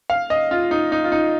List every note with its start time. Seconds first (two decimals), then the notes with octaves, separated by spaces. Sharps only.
0.10 F5
0.30 D#5
0.51 F4
0.71 D#4
0.92 D#4
1.04 F4
1.12 D#4